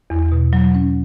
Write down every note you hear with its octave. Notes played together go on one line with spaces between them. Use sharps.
E2
B2
F#3
C#4